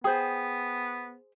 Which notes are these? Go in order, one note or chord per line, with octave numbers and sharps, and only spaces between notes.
B3 G#4 C5 G5 D#6